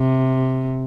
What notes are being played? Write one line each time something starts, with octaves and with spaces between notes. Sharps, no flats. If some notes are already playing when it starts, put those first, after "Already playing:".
Already playing: C3